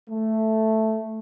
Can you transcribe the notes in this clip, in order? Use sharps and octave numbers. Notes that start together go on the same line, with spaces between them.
A3